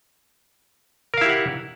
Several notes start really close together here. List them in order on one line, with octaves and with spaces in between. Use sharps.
A#4 F5 E4 G4 F#5